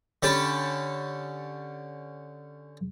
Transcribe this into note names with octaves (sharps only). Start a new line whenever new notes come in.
D3 C#4 G4 A5 B5